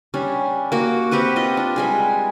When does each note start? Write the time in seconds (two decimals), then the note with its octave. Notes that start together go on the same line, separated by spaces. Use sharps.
0.14 G3 C#4 D4
0.72 A#3 F#4
1.11 C4 G4 B4 F#5
1.36 F4 D#5
1.57 D4
1.76 G3 G#3 G#4